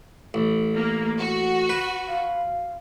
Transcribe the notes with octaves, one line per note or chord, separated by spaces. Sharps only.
A1
A#3
F#4
B4
F5